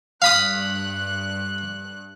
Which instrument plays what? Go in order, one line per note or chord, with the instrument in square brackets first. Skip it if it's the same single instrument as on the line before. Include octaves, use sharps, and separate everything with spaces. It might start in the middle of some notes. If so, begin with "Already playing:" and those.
[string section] G2 F#6 [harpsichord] F5 B5 D#6